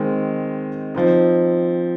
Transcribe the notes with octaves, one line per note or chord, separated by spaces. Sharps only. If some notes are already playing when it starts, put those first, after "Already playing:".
Already playing: D#3 G#3 C4 D#4
F3 C4 D#4